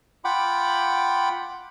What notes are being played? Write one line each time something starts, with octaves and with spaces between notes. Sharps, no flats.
F4 F#5 G5 B5 D6